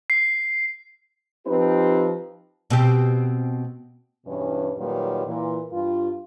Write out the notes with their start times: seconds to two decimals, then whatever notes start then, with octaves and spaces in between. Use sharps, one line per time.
0.10 C7
1.46 F3 C4 D#4 G4 B4
2.70 B2 C4 G4
4.26 E2 G2 B2 E3 C#4
4.78 D#2 A#2 D#3 F#3 G3 B4
5.26 A#2 E3
5.72 G2 F4